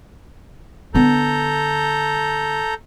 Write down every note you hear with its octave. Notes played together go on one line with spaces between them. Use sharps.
D3 B3 A4 A#5 G6